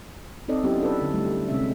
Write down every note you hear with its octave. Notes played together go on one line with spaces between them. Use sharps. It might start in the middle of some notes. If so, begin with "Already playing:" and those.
C4 D#4 A4 D5 D#5
F#3 B3 C#4 E4 G4
D4 A4 B4
D3
G3 A3
C3 G#3 C#4 E5